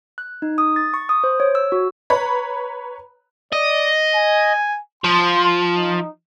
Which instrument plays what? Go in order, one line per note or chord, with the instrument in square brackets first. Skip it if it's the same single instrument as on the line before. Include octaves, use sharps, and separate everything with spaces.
[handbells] F#6
D#4
D#6
A6
C#6
D#6
C5
C#5
E6
F#4
[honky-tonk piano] B4 C#5 A#5 B5
[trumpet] D5 [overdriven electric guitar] D#5
[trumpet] G#5
[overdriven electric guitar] F3 [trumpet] C6
[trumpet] D#4